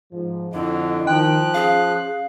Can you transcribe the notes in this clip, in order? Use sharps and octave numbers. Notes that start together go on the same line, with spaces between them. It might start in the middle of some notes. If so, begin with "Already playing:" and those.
G#2 F3
F2 D3 D4 E4 D#5
D#3 F3 G5 F#6
C#4 G#4 F5